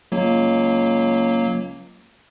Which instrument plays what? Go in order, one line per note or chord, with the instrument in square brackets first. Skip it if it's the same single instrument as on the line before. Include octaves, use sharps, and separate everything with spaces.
[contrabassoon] C#2 [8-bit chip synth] F#3 A#3